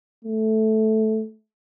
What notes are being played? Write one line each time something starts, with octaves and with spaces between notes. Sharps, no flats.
A3